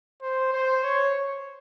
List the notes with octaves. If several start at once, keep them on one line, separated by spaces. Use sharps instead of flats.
C5
C5
C#5